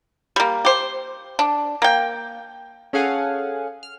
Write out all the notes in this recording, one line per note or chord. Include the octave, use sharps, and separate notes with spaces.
G3 A#3
G4 C5
D4
A#3 G5
C#4 G#4 A4 F5 F#5 G#5
F6